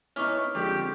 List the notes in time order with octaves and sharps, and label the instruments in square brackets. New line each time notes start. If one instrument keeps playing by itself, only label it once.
[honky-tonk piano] B3 E4 [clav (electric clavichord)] C#4 D#4 [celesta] C#6 D6 F6
[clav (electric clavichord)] F2 [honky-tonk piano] D3 G3 G#3 [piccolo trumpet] G4